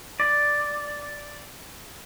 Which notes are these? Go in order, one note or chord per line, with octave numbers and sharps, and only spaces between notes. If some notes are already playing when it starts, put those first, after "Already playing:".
D5